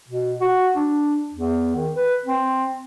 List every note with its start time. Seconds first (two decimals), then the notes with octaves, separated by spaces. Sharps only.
0.08 B2
0.40 F#4
0.76 D4
1.34 E2
1.76 D#3
1.96 B4
2.26 C4